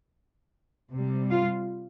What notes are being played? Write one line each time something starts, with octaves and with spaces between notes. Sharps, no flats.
C3 G3
F4